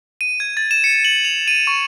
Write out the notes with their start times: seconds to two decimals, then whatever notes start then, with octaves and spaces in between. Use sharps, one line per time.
0.21 D#7
0.40 G#6
0.57 A6
0.71 E7
0.84 C#7
1.05 F#7
1.25 F7
1.48 D#7
1.67 C#6